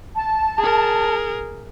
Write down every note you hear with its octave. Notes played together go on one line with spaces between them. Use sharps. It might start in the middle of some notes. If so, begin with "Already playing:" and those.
A5
G#4 A#4